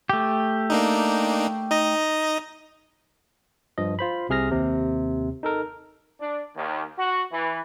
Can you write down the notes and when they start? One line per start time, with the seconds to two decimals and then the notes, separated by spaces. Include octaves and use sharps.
0.10 A3 G4
0.70 A#3 D4 D#4
1.71 D#4 D#5 A#6
3.78 G2 F3 D#5
3.99 F4 C5 B5
4.29 C2 C3 G#4 F6 A#6
4.51 D#2 C3
5.43 D#4 A4 A#4
6.20 D4
6.56 D#2
6.98 F#4
7.31 E3